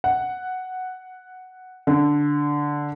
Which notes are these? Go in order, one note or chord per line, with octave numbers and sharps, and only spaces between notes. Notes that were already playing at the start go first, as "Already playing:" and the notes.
F#5
D3